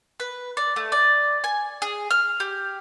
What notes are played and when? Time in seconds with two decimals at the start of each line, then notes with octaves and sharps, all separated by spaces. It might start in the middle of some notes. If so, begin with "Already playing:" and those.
0.20 B4
0.57 D5
0.76 A3
0.92 D5
1.44 G#5
1.82 G#4
2.11 F6
2.40 G4